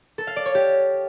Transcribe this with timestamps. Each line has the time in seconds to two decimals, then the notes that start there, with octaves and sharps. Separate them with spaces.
0.18 A4
0.27 F5
0.36 D5
0.46 C#5
0.55 G4